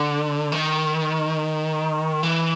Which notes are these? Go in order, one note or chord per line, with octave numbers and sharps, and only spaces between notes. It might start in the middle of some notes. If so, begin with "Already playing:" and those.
Already playing: D3
D#3
E3